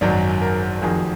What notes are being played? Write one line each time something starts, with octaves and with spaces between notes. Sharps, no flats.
G#1 F#2 D#3 F#3 D5
A#4
F1 F2 D#3 F#3 G#4